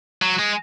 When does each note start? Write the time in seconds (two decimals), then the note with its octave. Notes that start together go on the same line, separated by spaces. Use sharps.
0.22 F#3
0.39 G#3